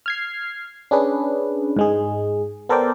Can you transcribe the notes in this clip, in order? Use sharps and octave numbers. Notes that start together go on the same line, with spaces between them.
F6 G#6 C7
C#4 D4 G#4 B4
G#2 G#3 G#4
B3 A4 A#4 C5 D5 G5